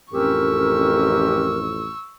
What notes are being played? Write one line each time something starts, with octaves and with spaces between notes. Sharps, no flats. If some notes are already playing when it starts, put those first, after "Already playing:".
A1 F2 C4 C#4 G4 A#4 C#6 E6